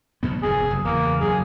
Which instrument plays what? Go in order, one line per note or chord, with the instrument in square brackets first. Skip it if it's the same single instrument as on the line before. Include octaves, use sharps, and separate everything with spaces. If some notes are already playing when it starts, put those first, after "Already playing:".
[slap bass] B1 B2 B3
[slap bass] F1 F2 G#2 [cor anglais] G#4
[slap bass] F#1
[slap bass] E2 C#3 E3 [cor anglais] A#3
[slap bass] F#1 G2 F#3 [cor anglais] G#4